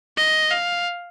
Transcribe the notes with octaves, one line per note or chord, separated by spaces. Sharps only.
D#5
F5